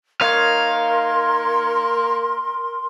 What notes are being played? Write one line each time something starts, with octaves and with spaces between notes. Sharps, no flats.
A#3 D#4 A#4 C#5 F5 C6